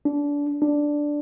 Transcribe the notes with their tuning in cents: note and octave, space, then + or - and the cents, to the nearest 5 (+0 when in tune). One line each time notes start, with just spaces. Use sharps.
D4 -25
D4 +0